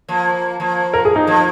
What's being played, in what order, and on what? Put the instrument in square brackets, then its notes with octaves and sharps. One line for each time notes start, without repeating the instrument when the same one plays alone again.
[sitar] F3 A#3
F3 A#3
[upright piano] A#4
G#4
D#4
[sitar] F3 A#3